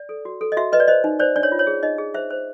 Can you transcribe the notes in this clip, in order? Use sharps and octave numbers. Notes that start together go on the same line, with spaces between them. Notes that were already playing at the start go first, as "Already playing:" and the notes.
Already playing: D5
A4
F#4
A4
D#5
F#4 E5
B4 D#5
D5
C5 D#5
D#4
C5 D5
D4 D5
C#5
F4
C#5
G#4
D#4 D#5
G#4
C5 E5
C5